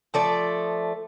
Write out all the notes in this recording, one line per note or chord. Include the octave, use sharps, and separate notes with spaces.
F3 A3 D5